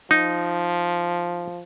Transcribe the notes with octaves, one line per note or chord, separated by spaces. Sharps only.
F3 D#4